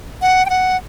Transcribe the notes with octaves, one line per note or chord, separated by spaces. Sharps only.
F#5
G5
F#5